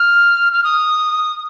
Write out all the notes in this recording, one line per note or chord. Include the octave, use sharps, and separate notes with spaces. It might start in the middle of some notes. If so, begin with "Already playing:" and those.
Already playing: F6
F6
D#6